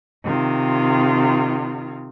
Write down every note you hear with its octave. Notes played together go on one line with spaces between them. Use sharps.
C3 D#3 F4